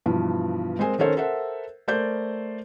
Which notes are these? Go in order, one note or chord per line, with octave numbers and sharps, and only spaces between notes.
G2 B2 E3 F3
G#3 C4 A#4 C5 G#5
D#3 C#4 A4 A#4 C5 C#5
A4 A#4 C5 E5 F#5
A3 A#4 C5 D5 G6